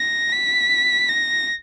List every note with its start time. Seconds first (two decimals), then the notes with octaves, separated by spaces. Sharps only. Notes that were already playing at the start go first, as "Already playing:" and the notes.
Already playing: A#6
0.32 B6
1.09 A#6